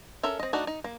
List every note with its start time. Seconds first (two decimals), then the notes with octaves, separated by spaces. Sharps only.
0.23 C#4 A4 A#4 E5
0.39 C4 D#5
0.53 A3 D4 D#4 F#4
0.67 D#4
0.84 A#3